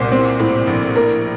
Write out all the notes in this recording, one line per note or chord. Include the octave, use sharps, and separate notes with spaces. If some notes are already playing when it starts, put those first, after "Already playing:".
Already playing: C2 A#2 C5
C4
A2
A#1
A#3 A#4